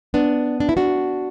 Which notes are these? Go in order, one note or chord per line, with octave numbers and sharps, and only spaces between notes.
B3 D4
D4
E4
D4 F#4